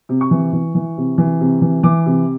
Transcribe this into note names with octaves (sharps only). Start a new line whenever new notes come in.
C3
C#6
E3
E3
E3
C3
E3
C3
E3
E3 D6
C3